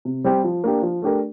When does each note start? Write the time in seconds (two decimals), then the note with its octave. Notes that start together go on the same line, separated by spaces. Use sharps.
0.05 C3
0.24 G3 C4 G4
0.44 F3
0.64 A#3 D4 G4
0.82 F3
1.02 A3 D4 G4 A#4